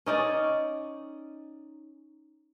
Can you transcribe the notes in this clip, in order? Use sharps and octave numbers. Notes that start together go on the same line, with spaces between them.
C#4 D#4 D5